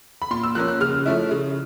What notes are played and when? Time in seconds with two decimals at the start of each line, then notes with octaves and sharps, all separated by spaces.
0.22 B5
0.31 A#2 C6
0.43 E6
0.55 F3 A#3 C#4 F#6
0.68 F#6
0.81 C#3 F6
1.06 F3 A3 C#4 E4
1.31 C#3